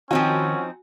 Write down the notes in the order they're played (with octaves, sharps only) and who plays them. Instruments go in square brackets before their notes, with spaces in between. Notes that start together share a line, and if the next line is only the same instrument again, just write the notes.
[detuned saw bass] D#3 [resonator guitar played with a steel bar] F3 C4 D#4 [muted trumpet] C#4 [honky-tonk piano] F#4 G#5